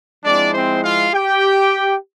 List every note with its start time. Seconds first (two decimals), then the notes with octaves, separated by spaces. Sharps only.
0.24 F3 G#3 C4 D4 E4 D5
0.54 C4 C5
0.84 F4 F5
1.14 G4 G5